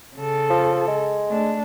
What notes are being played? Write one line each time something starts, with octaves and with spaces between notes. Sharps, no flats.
C#3 A4
F3
G#3
A3 D4